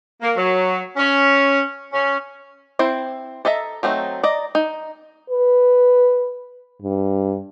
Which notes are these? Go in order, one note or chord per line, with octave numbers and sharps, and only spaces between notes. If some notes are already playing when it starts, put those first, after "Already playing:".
A#3
F#3
C#4
C#4
C4 E4 C5
A4 D#5 E5 A#5
F#3 A3 C4 D#4
D5 D#5 A#5
D#4
B4
G2